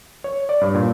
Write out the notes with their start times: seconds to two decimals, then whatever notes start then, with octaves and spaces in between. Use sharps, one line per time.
0.24 C#5
0.49 D5
0.61 G2
0.75 A#2